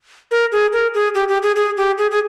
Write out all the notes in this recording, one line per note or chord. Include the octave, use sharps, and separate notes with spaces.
A#4
G#4
A#4
G#4
G4
G4
G#4
G#4
G4
G#4
G#4